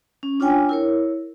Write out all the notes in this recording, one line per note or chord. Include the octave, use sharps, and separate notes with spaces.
C#4
D4 F4 C#5 G5 G#5
E4 A#4 C#5